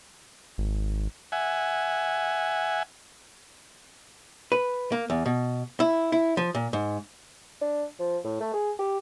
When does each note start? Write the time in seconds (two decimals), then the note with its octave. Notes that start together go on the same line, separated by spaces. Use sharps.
0.58 G#1
1.32 E5 F#5 G#5
4.52 B4
4.92 A#3
5.10 E2
5.26 B2
5.80 E4
6.12 E4
6.37 F3
6.55 A#2
6.73 G#2
7.61 D4
7.99 F3
8.24 A2
8.40 A3
8.54 G#4
8.79 G4